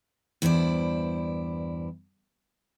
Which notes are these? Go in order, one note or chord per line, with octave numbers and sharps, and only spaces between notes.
E2 G2 E4 C5 D5